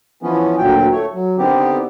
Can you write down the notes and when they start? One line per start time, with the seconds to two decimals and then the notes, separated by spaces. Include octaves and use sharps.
0.23 E3 F3 B3 C#4
0.58 D2 A#2 F#3 G5
0.92 A3 C#5
1.14 F#3
1.38 D3 D#3 B3 C4 G4